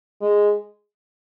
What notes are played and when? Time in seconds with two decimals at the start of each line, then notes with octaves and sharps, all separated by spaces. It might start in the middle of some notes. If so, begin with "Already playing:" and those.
0.21 G#3